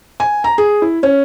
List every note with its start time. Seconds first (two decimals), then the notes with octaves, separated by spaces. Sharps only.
0.20 G#5
0.44 A#5
0.58 G#4
0.82 E4
1.03 C#4